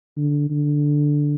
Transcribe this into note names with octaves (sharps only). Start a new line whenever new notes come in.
D3
D3